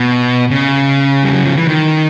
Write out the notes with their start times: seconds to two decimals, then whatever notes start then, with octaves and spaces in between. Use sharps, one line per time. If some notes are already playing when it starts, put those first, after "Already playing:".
Already playing: B2
0.50 C#3
1.24 G3
1.34 F#3
1.45 F3
1.56 E3
1.67 D#3